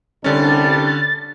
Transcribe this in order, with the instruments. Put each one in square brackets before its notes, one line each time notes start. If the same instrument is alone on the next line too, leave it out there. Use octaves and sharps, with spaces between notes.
[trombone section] C2 G3 D4 [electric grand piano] D3 C#4 [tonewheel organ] A6